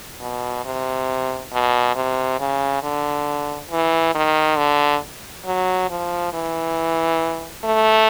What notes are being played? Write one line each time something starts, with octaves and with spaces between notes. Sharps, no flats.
B2
C3
B2
C3
C#3
D3
E3
D#3
D3
F#3
F3
E3
A3